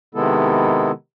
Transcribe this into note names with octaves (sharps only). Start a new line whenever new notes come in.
C3 D#3 G#3 B3 E4 A4